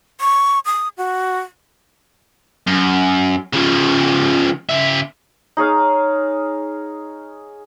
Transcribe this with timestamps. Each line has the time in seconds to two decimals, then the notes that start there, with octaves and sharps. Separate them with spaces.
0.21 C#6
0.66 D#6
0.97 F#4
2.67 F#2
3.53 C#3 F3
4.69 C#3 E5
5.57 D#4 G#4 C#5 F5